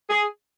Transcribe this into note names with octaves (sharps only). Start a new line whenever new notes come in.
G#4